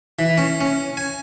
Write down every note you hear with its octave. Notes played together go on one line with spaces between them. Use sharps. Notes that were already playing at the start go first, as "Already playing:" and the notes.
E3
C#4
C#4
G#5